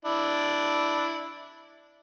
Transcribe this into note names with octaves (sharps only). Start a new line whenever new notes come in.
D4 E4